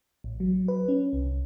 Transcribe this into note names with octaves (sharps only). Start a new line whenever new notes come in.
A1
F#3
B4
C#4
C2